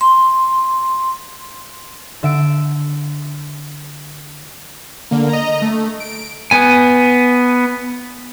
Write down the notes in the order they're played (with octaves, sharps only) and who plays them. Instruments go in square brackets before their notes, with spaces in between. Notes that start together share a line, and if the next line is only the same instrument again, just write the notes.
[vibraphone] C6
[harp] D3 E5 D7
[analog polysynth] D3 A#3
D#5 A#5
A3
D7
[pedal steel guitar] B3 G#5